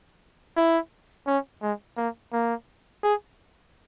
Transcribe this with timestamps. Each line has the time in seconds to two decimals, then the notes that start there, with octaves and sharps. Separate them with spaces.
0.57 E4
1.27 C#4
1.62 G#3
1.97 A#3
2.33 A#3
3.03 G#4